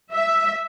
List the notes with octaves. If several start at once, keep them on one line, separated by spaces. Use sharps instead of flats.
E5